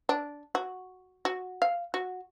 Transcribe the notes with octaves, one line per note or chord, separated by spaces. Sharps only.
D4
F#4
F#4
F5
F#4